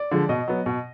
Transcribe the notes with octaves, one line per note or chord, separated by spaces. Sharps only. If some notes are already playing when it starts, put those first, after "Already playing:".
Already playing: D5
D3 F3 G#3
B2 D#5
F#3 B3
B2